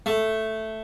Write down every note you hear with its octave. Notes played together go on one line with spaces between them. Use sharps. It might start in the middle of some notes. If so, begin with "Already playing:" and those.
A3